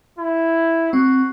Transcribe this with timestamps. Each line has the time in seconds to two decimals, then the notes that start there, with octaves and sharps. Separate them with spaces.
0.18 E4
0.93 C4 F#4